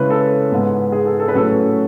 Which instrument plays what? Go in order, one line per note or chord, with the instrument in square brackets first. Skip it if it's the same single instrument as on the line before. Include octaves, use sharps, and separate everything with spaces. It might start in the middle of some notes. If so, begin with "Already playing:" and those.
Already playing: [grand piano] C#3 G#3 C#4 E4 B4
A4
G#2 G#3 B3
G#4
A4
A4
B4
A2 F#3 C#4 A4